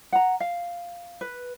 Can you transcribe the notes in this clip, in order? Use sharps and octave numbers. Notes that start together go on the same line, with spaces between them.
F#5 A#5
F5
B4